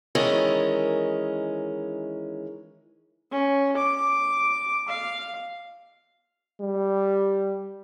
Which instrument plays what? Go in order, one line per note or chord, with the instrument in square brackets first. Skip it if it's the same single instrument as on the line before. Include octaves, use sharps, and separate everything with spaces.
[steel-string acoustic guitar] D#3 E3 G#3 C#4 A#4 D#5
[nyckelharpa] C#4
D6
F5
[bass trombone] G3